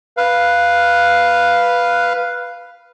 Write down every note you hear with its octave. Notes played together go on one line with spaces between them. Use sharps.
B4 F5